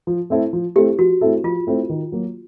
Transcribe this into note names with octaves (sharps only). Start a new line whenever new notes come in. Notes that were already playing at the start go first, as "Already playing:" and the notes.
F3
A3 C4 E4 A4
F3
A3 C4 E4 G4 A4
F3 F#4
A3 C4 E4 A4
F3 F4
A3 C4 E4 A4
D#3
F#3 A#3